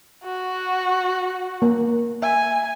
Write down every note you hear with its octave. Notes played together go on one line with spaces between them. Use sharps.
F#4
A#3
E5 G#5